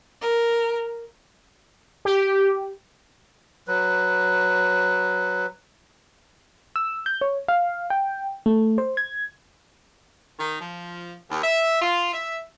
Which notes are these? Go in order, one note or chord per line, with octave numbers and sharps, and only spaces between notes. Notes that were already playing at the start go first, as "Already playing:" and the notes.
A#4
G4
F#3 B4
E6
G6
C#5
F5
G5
A3
C5
G#6
D#3
F3
D#2
E5
F4
E5